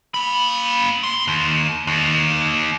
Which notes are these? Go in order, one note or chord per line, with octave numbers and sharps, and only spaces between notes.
A#3 B5
G#2 C6
D#2
D#2